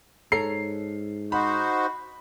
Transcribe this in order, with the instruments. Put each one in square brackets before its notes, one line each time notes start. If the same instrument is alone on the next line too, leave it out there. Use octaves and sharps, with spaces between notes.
[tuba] G#2 [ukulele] A4 C#5 A#5 [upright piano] C7
[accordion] D#4 F#4 C5 [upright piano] B5